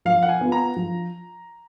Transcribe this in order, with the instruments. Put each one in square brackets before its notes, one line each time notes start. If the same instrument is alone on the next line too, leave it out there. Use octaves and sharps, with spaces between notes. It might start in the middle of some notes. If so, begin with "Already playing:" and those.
[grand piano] F3 [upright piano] F5
[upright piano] F#5
G#5
[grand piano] B3 F4
[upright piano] A#5
[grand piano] F3